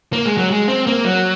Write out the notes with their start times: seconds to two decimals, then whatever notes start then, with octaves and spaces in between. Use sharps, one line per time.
0.13 A#3
0.26 G#3
0.37 F#3
0.51 G#3
0.68 C4
0.87 A#3
1.05 F#3